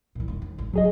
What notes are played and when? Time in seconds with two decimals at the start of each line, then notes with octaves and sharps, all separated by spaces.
0.15 A#2 E3
0.28 E1 D#3
0.42 D#2
0.58 G#1
0.73 F#3 A3 D#4 G#4 D#5